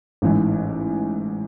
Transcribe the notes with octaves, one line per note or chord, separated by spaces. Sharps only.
A1 G#2 E3